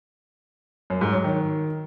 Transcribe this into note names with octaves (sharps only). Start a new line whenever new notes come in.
F#2
G#2
F#3
D#3